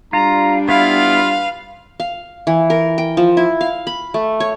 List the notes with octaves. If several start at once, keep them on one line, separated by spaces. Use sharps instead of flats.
G3 D4 F4 A#5
B3 E4 F4 B4 F5
F5
E3
A#4
G5
F3
E4
F5
B5
A3
C#5